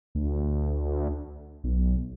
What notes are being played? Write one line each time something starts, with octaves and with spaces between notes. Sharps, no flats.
D2
B1